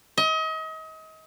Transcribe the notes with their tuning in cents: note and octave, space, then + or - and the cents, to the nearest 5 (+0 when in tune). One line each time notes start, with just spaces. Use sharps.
D#5 +35